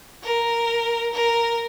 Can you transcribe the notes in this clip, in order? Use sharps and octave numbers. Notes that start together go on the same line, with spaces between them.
A#4
A#4